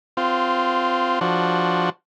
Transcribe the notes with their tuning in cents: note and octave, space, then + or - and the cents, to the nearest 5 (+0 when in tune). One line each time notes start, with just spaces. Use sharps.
C4 -15 F4 +0
F3 +0 D4 +0 F#4 +0